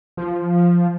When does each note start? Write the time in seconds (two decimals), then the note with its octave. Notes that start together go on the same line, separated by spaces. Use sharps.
0.17 F3